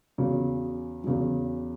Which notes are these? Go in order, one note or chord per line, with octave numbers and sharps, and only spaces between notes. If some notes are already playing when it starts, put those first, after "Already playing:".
E2 C#3 F#3
E2 C#3 F#3